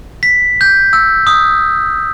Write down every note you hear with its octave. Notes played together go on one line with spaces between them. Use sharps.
B6
G6
E6
D#6